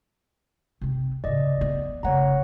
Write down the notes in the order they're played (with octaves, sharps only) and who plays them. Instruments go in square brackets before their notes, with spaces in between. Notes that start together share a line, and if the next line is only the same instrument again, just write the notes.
[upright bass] C3 C4
[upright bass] A2 C#3 [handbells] D5 D#5
[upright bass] F3 B3
[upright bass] F1 C#3 [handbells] C#5 F#5 A#5